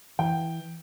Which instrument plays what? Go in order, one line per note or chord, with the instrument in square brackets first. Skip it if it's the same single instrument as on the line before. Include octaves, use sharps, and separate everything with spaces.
[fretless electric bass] E3 [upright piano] G5